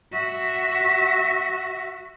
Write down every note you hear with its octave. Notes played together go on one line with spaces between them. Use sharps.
F#4 E5